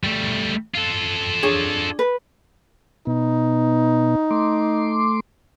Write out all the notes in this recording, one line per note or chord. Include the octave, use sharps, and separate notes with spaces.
G3 A3
F4 A4
D4 G#4 C#5
B4
B2 B3 D#4
A3 C6 D6